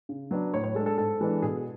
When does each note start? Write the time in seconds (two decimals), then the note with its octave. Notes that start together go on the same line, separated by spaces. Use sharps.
0.09 C#3
0.31 F#3 B3 D4
0.53 A2 C#5
0.64 C#5
0.75 G#3 A4
0.79 D4
0.86 A4
0.98 G#2 A4
1.21 E3 G#3 B3 D4
1.42 B2 G#4